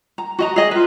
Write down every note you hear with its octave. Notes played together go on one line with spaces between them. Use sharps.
A#5
F#4 D#5 A#5
G#4 D#5
F4 B4